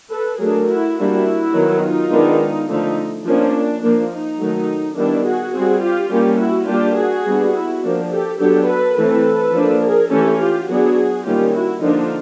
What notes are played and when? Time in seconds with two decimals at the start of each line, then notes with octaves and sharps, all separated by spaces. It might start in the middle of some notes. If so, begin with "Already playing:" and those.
0.11 A4 B4
0.40 F#3 A3 D4 G#4 A#4
0.68 E4 F#4
0.97 G3 A#3 D4 E4 F#4
1.54 D#3 F#3 B3
1.82 D#4 F4
2.11 D#3 G#3 B3 D4
2.68 D3 F3 A3 D#4
3.26 F3 A#3 C#4 D4
3.82 F3 A#3 D4
4.11 D#4
4.40 D#3 F#3 A3
4.97 D#3 G3 B3 D4 E4
5.25 F#4 G#4
5.54 G3 C4 F#4 G#4
5.82 F4 G4
6.10 G3 A#3 C#4 F4 G4
6.39 E4 F#4
6.68 G3 A#3 D4 F4 G4
6.97 F#4 G#4
7.26 G3 B3 D4
7.54 E4 F#4
7.83 F3 A#3 D4
8.11 G4 A4
8.39 F#3 B3 D4 G4 A4
8.67 A4 B4
8.96 E3 A3 C4 A4 B4
9.54 F3 A#3 D4
9.82 G#4 A#4
10.11 E3 A3 C#4 G4 A4
10.39 F4 G4
10.68 F#3 B3 D4 F#4 G#4
11.25 D#3 G3 A#3 C#4 F4 G4
11.53 E4 F#4
11.82 D3 F3 A#3 D4 D#4 F4